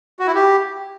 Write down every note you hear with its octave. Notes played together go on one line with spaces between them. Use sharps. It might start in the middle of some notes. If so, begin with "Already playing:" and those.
F#4
E4
G4